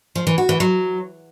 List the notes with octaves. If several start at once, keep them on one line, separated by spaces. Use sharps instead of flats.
F3
E3
F#4
E3
F#3